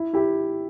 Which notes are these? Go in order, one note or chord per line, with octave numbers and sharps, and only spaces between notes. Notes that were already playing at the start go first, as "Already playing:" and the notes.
Already playing: E4
E4 G4